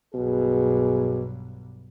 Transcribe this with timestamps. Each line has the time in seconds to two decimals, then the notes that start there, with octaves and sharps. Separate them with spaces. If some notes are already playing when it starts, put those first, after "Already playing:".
0.15 B1 G2 B2 G#4